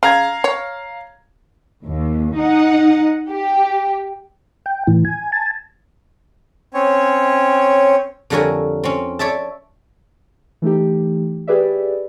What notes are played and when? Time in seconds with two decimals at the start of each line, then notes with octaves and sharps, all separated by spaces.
0.03 C#3 F5 A#5 G#6
0.44 C#5
1.84 D#2
2.37 D#4 F#5
3.30 G4
4.66 G5
4.87 A2 E3
5.05 G#5
5.32 G#5 A5
6.74 C4 C#4 C#5
8.30 F2 D3 G3 A#4 C#5 G#5
8.84 C4 C#4
9.19 C#5 D5 E5 A5
10.62 E3 A3 D#4 G4
11.47 G4 G#4 B4 D5 E5